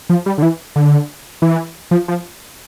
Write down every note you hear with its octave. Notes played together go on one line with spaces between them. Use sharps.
F3
G3
D3
E3
D3
E3
F3
F3